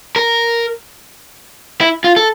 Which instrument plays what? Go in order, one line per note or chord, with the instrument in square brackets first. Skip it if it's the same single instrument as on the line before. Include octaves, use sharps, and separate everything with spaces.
[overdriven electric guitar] A#4
E4
F4
A4